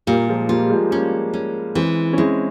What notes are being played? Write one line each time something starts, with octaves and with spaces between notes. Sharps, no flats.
A#2 G3 A#3
F3 G#3
G3 A#3 F4
G3
F3 G#3
G3 A#3 C#4
C#4
E3 G#3 C4
C#4
G#3 C4 E4